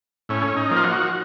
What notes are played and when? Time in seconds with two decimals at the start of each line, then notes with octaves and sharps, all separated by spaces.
0.29 A2 C#4
0.57 D#4
0.71 F3 A#3
0.77 F4
0.84 F#4